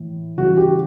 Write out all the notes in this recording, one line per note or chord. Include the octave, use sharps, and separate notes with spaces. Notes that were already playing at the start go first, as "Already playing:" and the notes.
Already playing: A2 E3
C#3 E3 G3 F#4
G4